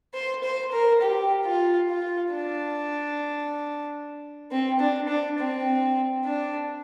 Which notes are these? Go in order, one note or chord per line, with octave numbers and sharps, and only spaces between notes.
C5
C5
A#4
G4
F4
F4
D4
C4
D4
D4
C4
D4